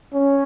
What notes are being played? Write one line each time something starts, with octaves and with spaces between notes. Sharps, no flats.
C#4